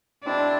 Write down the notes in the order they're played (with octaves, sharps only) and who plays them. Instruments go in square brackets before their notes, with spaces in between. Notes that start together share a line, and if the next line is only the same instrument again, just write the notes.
[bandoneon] B2 G#3 C4 E4 [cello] D4